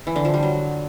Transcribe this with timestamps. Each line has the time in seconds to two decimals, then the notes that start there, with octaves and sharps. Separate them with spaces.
0.07 E3
0.16 D3
0.25 F3
0.34 G3
0.43 F#3